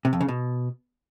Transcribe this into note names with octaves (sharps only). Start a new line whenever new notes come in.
C3
F2
C#3
B2